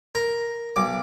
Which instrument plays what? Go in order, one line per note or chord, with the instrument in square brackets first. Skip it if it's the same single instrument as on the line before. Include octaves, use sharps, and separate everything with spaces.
[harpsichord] A#4
B1 D6